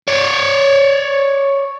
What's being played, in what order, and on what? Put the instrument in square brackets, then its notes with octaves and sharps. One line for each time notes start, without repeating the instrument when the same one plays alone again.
[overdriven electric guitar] C#5 D5